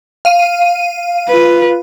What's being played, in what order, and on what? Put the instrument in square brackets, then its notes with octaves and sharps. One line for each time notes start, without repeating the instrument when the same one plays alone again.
[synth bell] F5 D#7
[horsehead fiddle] F4 B4